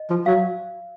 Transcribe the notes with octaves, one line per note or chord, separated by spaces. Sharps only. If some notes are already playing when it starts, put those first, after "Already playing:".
Already playing: D#5
F3
F#3 F5